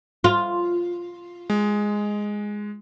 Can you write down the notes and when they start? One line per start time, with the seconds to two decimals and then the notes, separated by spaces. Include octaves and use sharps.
0.24 F4
1.50 G#3